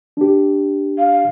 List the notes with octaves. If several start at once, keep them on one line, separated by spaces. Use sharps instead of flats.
D4 G4
F5